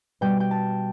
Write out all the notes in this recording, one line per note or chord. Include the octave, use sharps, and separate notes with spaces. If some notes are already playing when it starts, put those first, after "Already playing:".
B2 G3 G5
G5
A5